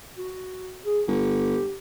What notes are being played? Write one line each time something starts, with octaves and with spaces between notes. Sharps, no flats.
F#4
G#4
G1 G4